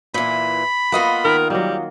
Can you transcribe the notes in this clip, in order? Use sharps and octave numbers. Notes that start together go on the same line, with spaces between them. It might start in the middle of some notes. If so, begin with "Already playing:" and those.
A#2 E3 B5
A#3 B3 F4 D#5 F#5
D#3 A#4
F#3 G3 A#3